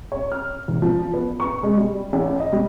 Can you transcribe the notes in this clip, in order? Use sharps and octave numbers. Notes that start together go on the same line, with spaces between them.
C#5
F6
E2
F3
B3
C#6
G#3
G3
A1
D#5
G3